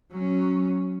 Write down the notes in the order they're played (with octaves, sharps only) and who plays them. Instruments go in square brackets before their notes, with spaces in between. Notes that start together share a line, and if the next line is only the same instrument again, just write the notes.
[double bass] F#3 C#4